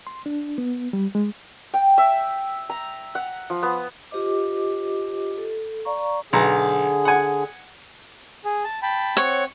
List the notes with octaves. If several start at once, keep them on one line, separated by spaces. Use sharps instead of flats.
C6
D4
B3
G3
G#3
G5
E5
A#5
F#5
F3
B3
F4 G4 C5 D#5 D6
A4
D5 F5 A#5 C#6
B1 D3 G#4 A#5
F#5 G#5
G#4
A5
G5 A5 B5
C4 C#5 F#5